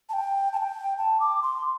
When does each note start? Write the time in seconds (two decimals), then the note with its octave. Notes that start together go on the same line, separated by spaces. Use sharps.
0.09 A5
0.13 G5
0.53 A5
0.57 G5
0.98 A5
1.20 D6
1.43 C6